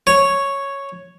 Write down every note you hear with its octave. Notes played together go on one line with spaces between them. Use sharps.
C#5